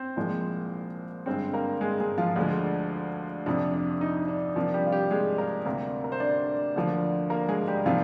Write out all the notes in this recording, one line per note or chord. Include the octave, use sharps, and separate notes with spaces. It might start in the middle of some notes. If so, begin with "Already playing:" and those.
Already playing: C4 C5
C2 A#2 F3 G#3
G2 D3 G#3 C4 C5
A#3 A#4
G#3 G#4
G#3 G#4
F3 F4
D2 D3 G#3
F2 C3 F3 D4
D4
D#4
D4
C3 F3 A#3 D4
G3 G4
F4
G3 G4
G#3 G#4
A#3 A#4
D2 C3 G3 A#3 A#4
A#4
C5
D4 D5
D2 D3 F3 A#3 D4
A#3 A#4
G#3 G#4
G3 G4
C3 D#3 F3 G3 A#3 F4